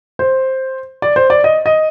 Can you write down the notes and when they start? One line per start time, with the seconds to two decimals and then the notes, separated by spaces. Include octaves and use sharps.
0.19 C5
1.02 D5
1.16 C5
1.30 D5
1.44 D#5
1.66 D#5